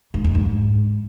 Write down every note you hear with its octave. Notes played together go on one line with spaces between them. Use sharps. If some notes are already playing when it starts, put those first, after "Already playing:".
G#2
F2
G#2